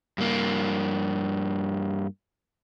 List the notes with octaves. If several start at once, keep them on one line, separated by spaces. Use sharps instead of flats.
G2 A#3